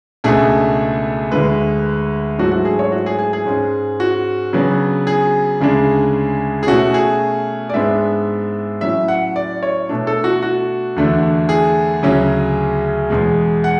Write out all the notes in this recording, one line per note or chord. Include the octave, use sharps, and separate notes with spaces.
C#2 B2 A3 D4 G#4
D2 D3 G#3 B4
G#2 F#3 A3 D4 F#4
F#4
G#4
C#5
F#4
G#4
G#4
G#4
G#2 G#3 C#4
F#4
C#3 F#3 B3 D4
G#4
D2 C#3 G#3 D4
G#4
B2 A3 C#4 F#4
G#4
D5
G#2 G#3 B3 D4 E5
A2 F#3 C#4 E5
F#5
D5
C#5
B2 A3 D4
A4
F#4
F#4
E2 D3 A3 D4
G#4
D2 C#3 F#3 C#4
E2 B2 G#3
F#5